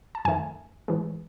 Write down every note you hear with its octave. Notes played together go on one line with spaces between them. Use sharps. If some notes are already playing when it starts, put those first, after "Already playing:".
A5
F#2 D#3 A3 G#5
A2 E3 G#3